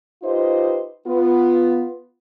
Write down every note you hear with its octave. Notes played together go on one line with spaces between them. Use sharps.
D#4 F4 G4 B4 C5 D#5
B3 F4